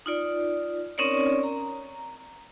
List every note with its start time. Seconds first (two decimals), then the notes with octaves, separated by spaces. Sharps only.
0.06 D#4 F4 D5
0.98 C4 C#4 D#4 A#4 C#5 D5
1.43 A#5